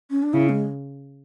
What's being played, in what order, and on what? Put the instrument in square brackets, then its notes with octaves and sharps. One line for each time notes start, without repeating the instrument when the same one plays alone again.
[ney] C#4
D4
[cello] C#3 [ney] E4
[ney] G#3